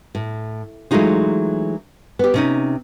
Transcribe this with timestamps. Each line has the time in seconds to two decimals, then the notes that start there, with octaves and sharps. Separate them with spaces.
0.15 A2
0.91 E3 F#3 G#3 A3 D#4 F4
2.19 B3 G4
2.34 C3 C#4 D#4